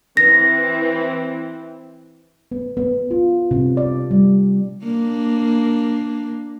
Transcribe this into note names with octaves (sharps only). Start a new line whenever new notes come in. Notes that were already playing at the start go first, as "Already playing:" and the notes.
E3 C4 A#6
B3
B3
F4
C3
D5
G3
A#3 D4